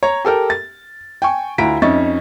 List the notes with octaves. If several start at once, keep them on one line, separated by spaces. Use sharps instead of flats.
C#5 A#5
G4 A4 A#4 G5
A6
G5 G#5 C#6
D2 E4 F4 A#5 B6 D7
F2 C#4 D#4 E5 C#6 A6